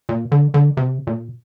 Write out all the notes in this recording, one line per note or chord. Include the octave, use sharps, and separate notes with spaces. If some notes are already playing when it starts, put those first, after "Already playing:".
A#2
D3
D3
C3
A#2